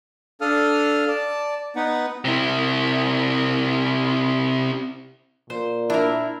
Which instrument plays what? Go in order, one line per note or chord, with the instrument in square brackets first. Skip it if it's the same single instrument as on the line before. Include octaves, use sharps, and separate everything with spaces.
[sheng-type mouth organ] D4 A4 F5 D#6 F6
D5 A5
B3 D#4 B4 F#5
[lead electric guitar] C3 E4
[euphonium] A#2 [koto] C5
[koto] D4 A#4 [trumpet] E4